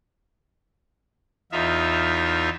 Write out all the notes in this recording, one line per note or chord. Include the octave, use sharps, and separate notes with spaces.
E2 D#4 F4 E5